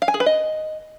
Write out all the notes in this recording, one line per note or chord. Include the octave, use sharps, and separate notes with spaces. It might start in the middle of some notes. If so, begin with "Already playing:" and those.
F5
G#5
G#4
B4
D#5